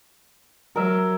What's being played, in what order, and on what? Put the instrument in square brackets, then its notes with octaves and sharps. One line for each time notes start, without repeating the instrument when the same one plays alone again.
[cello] F#3 [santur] A#4 E5